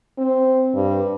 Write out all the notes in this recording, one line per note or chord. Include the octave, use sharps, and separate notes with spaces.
C4
G2